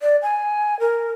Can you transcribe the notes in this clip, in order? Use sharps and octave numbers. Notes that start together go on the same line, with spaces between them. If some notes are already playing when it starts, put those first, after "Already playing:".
D5
G#5
A#4